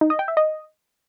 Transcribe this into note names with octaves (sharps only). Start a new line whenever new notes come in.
D#4
D#5
G5
E5
D#5